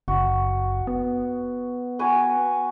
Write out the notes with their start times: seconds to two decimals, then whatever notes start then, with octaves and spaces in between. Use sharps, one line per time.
0.08 F#1 F#4
0.87 B3
1.99 F#4 B4 G#5